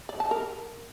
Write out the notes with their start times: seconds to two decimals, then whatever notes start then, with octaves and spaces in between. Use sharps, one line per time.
0.09 D5
0.20 A5
0.31 A#4